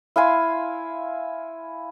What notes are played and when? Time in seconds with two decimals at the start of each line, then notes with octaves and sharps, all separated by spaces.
0.16 E4 F5 G#5 C6